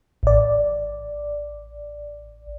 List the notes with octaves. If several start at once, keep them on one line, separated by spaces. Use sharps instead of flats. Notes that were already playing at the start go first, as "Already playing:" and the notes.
A1 D5